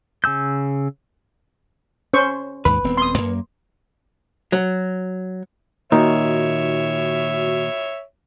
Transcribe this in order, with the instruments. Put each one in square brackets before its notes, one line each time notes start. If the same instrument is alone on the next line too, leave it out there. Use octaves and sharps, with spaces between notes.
[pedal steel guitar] C#3 G#5 E6 G6
[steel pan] C#4 C5 C#6
[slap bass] D#2 G#2 [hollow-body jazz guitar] B4
[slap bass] D#1 B3 C4
[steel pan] C6 D#6
[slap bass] F#2 A#3
[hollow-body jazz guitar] F#3
[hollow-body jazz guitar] A#2 D#3 [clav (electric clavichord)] D#4 [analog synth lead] F#4 [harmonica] C#5 E5